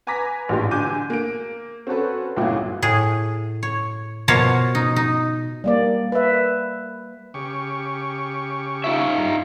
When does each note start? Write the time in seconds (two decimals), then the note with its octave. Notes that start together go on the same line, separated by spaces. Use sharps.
0.07 B4 G#5 A#5 D6 A#6 B6
0.49 A1 A#2 D4 F4 G4 C6
0.71 D3 G#5 D6 G6 D#7
1.10 A#3 D7
1.87 C4 C#4 F#4 A4 B4
2.36 G1 C#2 A#2 E4 F#4 G#4
2.82 A2 G#4
3.63 C#5
4.28 B2 F3 A#3 C#5
4.75 D#4
4.96 D#4
5.64 G3 A#3 D5
6.12 B4 E5
7.34 C#3 G4 C#6
8.84 D#4 F4 E5
9.18 G2 A#5